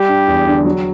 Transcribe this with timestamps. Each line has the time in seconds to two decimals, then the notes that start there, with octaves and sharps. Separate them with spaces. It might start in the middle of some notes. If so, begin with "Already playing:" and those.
Already playing: G3 G4
0.08 D4
0.28 E2
0.46 D3
0.65 F#3